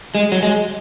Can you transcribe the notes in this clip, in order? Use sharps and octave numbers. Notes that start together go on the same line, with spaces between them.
G#3
F#3
G#3